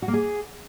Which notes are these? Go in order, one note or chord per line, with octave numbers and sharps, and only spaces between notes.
F#4
A#3
G#4